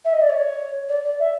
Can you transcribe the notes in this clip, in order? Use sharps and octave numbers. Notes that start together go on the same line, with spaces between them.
E5
D#5
D5
C#5
D5
D5
E5